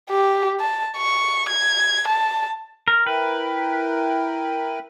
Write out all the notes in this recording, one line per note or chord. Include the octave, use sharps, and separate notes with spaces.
G4
A5
C#6
G#6
A5
A#4
E4 A#4 B4 G5